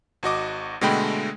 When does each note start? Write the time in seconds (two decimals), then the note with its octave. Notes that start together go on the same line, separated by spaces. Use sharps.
0.23 G#1 F#4 D#5 D6
0.81 B2 D3 G#3 A3 G5 B5